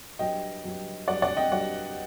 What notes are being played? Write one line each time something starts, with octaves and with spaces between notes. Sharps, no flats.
G2 F#3 D#5 G5
G2 F#3
G2 F#3 D5 F#5
D5 F#5
D#5 G5
G2 F#3 D5 F#5